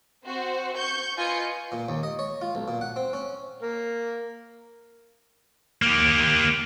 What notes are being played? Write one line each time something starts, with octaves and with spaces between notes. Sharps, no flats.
C4 F#4 C5
C#6 G6
F4 B4 D#5 G#5 G6 C#7
A#2
D#2
D#5
C#5
F4
B1
A#2
F#5
C4
C#4
A#3
A#3 G4